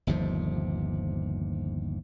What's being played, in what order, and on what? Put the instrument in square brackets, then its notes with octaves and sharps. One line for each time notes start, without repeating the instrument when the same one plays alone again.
[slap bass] G1 D#2 C3 F3